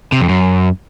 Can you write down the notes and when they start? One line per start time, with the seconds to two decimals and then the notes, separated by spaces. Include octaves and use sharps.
0.12 C3
0.21 F2
0.29 F#2